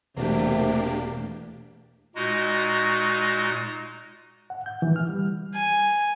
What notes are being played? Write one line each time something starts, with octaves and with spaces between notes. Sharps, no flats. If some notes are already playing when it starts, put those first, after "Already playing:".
E1 C3 A3 A#3 D4 G4
A#2 G#3 D#4 F#4
F#5
G6
E3
F6
G3
G#5